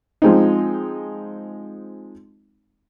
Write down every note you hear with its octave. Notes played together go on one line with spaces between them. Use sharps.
F3 G#3 C4 D#4